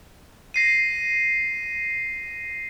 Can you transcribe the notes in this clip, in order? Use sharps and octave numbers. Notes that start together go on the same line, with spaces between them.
A#6 C7 D#7